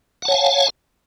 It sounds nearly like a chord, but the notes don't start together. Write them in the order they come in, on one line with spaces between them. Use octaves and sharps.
F#5 A5 C#5 G#5 F5